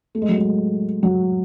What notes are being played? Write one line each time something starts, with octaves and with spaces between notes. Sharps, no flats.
A3
G#3
F#3
G#3
F#3